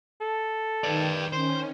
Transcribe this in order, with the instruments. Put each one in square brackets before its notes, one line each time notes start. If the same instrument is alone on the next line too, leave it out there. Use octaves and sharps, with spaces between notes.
[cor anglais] A4
[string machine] D#3 G5 [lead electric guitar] B4 D5
[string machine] D#3 C#4 [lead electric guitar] C5